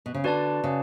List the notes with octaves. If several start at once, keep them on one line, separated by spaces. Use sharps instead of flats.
B2
C#3
D3 F#4 B4 D5 A5
C#3